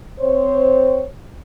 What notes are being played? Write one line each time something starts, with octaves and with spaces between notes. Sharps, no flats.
C4 C5 C#5